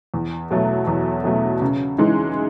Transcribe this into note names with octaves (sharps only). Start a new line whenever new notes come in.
E2
B2 F#3 A3
E2
B2 F#3 A3
C#3
E3 G#3 D#4